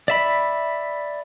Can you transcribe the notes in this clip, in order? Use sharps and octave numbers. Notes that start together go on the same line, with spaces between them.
D5 E5 B5